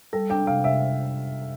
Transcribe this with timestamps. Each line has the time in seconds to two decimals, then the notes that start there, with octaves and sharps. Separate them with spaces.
0.13 G3 A4
0.30 D4 G5
0.47 C3 F5
0.64 C3 E5